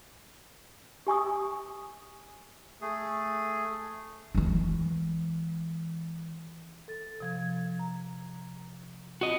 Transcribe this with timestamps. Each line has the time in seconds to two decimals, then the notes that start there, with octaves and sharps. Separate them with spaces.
1.07 G4 G#5 C#6 D#6
2.81 A3 G#4
4.35 E3 G#3
6.88 A4 A6
7.20 C3 F3 G#6
7.79 A#5
9.21 C4 F4 F#4 D#5